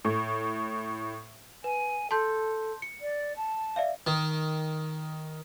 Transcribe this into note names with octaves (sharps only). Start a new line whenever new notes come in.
A2
B4 G#5
A4 A5 C6 G6
C#7
D5
A5
D5 E5 F5
D#3